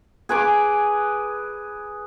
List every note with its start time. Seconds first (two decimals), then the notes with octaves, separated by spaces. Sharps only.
0.29 G#4 B4 G#5 D6